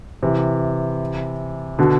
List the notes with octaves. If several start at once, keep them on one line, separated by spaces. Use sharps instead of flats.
C3 E3
B2 D3